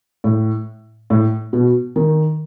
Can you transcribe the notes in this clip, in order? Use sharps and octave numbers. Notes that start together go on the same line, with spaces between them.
A2
A2
B2
D#3